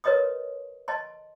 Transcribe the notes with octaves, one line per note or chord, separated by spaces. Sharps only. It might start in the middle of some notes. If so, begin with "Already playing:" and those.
A#4 B4 C#5 D#5 C6 D#6
D#5 A5 C6